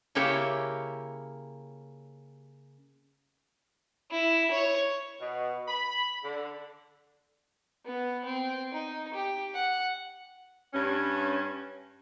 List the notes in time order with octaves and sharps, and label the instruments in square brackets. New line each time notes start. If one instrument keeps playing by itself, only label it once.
[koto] C#3 A#3 E4 G4 C#5 G5
[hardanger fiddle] E4
C#5
[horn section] B2
B5
D3
[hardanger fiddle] B3
C4
D#4
G4
F#5
[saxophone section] G2 C#4